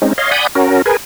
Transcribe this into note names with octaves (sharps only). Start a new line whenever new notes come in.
G#3 C4 C#4 D#4
C#5 D#5 F5 C6
D5 F#5 G#5 B5 D#6 G6
C#4 F#4 A#4
G#4 A#4 B4 G#5